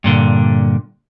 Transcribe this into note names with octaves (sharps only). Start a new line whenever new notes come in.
G2 A#2 D3